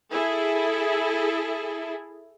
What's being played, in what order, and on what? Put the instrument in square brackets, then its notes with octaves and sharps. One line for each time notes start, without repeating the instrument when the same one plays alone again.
[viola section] E4 G#4 A4